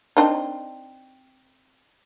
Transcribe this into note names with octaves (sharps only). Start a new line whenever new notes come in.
C4 D4 D#4